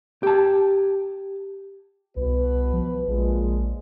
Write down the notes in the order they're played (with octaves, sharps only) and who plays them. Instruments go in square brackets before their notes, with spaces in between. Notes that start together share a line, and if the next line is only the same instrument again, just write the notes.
[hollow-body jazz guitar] G4 A5
[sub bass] C2 [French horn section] B2 B4
[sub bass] F3
[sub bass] A#1 [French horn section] A#2 F3 G#3